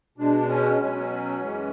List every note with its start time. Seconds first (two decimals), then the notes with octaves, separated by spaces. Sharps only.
0.18 B2 G#3 D4
0.49 C#4
0.79 B2 F#3 C#4
1.41 F#2 E3 G#3